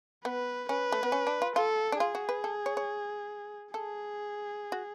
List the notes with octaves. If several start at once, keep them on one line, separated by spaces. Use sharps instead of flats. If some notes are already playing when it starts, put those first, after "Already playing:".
B3 B4
C#4 B4
A3
B3
C#4
D4
F4
F4 A4
D4
F4 G#4
F#4
B4
A4
C#5
C#5
G#4 A4
F#4